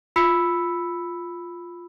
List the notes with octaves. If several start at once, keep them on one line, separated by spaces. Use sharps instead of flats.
F4 B5 E6 B6 C#7